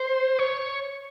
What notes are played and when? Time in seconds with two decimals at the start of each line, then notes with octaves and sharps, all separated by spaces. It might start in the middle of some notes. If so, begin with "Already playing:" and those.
Already playing: C5
0.39 C#5